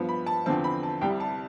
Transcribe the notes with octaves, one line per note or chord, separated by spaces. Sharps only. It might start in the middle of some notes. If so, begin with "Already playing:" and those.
Already playing: G2 F3 B3
B5
A5
E2 D3 F3 C4 A5
B5
A5
C2 C3 G3 G5
A5